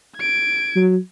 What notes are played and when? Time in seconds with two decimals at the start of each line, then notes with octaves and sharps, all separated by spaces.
0.16 G#6 D7
0.76 F#3